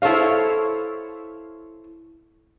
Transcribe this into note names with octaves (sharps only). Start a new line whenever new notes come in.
E4 A4 C5 C#5 F5